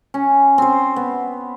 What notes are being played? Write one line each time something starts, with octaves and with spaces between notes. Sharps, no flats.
C#4
C4 C5
B3